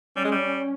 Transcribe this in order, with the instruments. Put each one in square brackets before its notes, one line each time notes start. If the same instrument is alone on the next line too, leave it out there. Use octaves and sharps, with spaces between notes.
[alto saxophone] G3 [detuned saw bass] C#4
[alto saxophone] G#3
G3